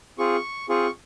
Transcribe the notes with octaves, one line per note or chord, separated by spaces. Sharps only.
C4 F4 G#4 C#6
C4 F4 G#4 C#6